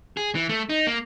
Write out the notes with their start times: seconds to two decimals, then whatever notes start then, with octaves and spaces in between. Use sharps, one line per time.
0.17 G#4
0.35 E3
0.49 A3
0.70 D#4
0.87 A#3